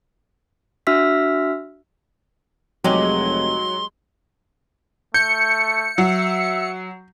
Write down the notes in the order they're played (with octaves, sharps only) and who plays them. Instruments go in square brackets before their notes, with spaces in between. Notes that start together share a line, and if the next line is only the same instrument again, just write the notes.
[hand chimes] D4 F#4 E5 E6 F6 B6
[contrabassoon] F1 [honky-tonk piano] F#3 [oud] G#3 D#4 G4 [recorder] C6
[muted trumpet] A3 [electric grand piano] G6 [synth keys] C#7
[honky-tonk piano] F#3 [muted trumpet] E5